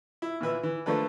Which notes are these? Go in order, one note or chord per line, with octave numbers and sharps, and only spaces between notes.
E4
A#2 E3 B4 E5
E3
F3 A3 A#3 D4 A4 B4